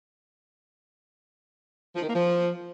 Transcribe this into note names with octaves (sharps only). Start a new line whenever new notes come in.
F3
D#3
A#3
F3